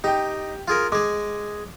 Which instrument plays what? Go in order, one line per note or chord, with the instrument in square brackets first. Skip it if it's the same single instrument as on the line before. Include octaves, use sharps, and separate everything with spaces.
[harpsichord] D#4 [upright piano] G4 G5
[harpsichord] F4 G#4 A#4
[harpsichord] G#3 G#4 [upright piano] D6